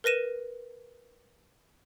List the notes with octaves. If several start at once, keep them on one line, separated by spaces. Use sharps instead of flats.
A#4 B4 A#6 D#7 E7